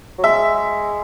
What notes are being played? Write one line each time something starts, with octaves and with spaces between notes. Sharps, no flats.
F#3
G#3 E5